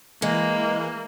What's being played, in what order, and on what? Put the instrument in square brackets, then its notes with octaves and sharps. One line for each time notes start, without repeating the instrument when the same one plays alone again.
[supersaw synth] E3 [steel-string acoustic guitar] G#3 [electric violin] A#3